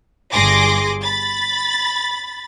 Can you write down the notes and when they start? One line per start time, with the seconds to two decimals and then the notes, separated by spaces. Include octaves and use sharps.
0.32 G1 G2 G#4 C6 D6 A#6
1.02 B5 A6